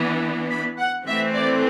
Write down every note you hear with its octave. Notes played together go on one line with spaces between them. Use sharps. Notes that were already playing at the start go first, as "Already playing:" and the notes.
Already playing: E3 B3 D4
B5
F#5
E3 A3 C4 E5
D5